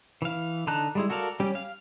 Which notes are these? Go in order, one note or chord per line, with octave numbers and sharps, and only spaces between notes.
E3 F5
D3 D#4 A5 A#5 F#6
G3 G#3 E4
F#4 A4 A#4 D5 F5
G3 C#4 G4
F5